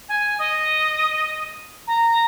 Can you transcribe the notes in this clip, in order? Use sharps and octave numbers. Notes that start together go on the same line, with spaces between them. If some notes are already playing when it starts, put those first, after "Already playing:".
G#5
D#5
A#5